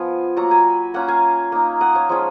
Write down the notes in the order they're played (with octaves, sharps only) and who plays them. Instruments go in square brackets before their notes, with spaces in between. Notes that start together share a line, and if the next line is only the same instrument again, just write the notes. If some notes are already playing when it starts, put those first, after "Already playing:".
Already playing: [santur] F3 B3 F4 F5 G#5
F#3 A#3 F4 A#5 C#6
G#5 B5
A#3 C#4 F4 F#5 A#5
F5 G#5
A#3 D#4
D#5 F#5
C#5 F5
F3 G#3 C#4 F4